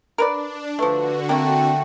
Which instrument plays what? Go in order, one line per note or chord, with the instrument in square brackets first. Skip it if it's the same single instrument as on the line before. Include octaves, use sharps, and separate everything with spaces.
[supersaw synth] D4 [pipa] A#4 B4 D5
[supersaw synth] D3 F#4 [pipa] F3 A3 [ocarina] B4
[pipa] A3 A#3 [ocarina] C4 [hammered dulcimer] G5